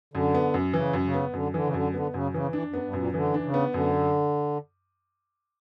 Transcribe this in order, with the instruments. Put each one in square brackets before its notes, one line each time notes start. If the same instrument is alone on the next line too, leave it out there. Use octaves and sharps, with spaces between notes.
[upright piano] F#2 [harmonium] D3
[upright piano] B3
F#2
[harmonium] C#3 [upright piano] E3
[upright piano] F#2
[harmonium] C#3
[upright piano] B3
[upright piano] F#2 [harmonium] D3
[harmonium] D3 [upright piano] E3
[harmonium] C#3
[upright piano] F#2 [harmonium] D3
[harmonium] D3 [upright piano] B3
[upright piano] F#2 [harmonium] C#3
[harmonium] C#3 [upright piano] E3
[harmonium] E3 [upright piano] D4
[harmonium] F#2 [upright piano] B3
[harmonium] G2
[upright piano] F#2 [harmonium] A#2
[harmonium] D3 [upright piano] E3
[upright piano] D4
[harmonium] C#3
[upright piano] B3
[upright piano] F#2 [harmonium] D3